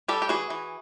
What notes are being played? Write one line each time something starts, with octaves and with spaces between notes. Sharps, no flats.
G3 G4 A4
G4
E3 F#4 G#4
E3